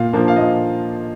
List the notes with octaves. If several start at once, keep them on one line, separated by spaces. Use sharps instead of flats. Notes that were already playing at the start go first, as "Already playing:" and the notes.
Already playing: A#2 F5
F3 A#3 D4
F5
A#2 D#5